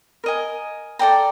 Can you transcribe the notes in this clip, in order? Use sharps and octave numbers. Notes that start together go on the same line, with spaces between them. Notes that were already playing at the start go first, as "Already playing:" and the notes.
A#4 D#5 G#5
A4 D5 G5 A#5